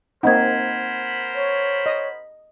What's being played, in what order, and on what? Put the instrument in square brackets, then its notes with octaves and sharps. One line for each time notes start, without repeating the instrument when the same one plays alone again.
[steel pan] A#3 C4 D#4 [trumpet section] A#4 C5 B5 [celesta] F#5 G#6
[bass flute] C#5
[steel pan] D#5